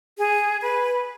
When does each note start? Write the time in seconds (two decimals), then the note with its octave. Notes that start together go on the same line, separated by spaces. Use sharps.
0.18 G#4
0.62 B4